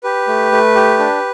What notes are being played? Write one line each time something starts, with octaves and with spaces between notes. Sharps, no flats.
G4 B4
A3
A3
G4
D4